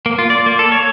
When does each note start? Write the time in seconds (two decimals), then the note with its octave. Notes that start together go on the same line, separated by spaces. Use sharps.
0.06 A#3
0.18 F4
0.30 D5
0.46 A#3
0.59 A4
0.72 C#5